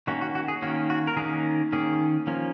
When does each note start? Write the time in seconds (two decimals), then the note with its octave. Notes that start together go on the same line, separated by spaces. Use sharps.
0.07 D#3 A#3 C#4 F#4
0.21 F#4
0.35 F#4
0.48 G#4
0.62 D#3 A#3 C#4 F#4
0.90 F#4
1.07 A#4
1.17 D#3 A#3 C#4 G#4
1.72 D#3 A#3 C#4 G#4
2.27 F3 A#3 C#4